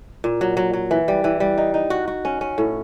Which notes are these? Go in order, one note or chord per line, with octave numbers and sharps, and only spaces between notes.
A#2
F#3
F#3
F#3
E3
G3
E3
G3
D#4
D#4
F#4
F#4
C#4
C#4
A2